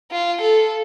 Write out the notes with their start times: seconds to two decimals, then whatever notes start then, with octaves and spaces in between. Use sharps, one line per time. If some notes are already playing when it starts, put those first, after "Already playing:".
0.11 F4
0.41 A4